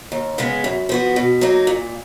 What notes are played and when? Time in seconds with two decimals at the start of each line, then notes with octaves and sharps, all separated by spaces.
0.12 D#2
0.38 C#3 G#3 B3
0.64 F#2
0.89 F3 B3 F#4
1.16 B2
1.41 F#3 A#3 D#4
1.67 A#2